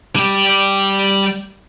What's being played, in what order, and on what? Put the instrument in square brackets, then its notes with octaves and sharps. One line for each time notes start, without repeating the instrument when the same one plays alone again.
[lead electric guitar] G3 G4